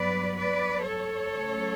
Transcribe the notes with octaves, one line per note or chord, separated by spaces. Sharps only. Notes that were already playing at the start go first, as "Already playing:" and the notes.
Already playing: G2 F#3 B3 B4 D5
B4 D5
A4 C#5
C#3 F#3 A3